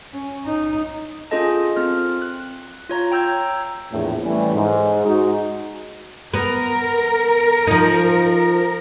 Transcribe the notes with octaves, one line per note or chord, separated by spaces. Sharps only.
C#4
D#4
C#4 F4 G#4 A4 D#5 A5
C4 F4 F6
F#6
F4 C#5 A#5
G5 A#5 E6 G6 G#6
A#1 E2 A2
E3 G3 A3 C#4
G#2
G#3 D#4 F#4
B3 A#4 A#5
F3 D#4